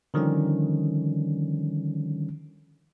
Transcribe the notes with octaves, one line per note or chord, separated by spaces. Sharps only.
D3 D#3 F3 G3 C#4